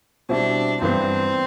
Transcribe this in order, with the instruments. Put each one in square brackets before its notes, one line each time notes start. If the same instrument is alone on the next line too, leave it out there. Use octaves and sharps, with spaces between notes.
[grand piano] B2 G3 C4 E4 [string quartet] D4
[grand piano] G2 E3 B3 [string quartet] C4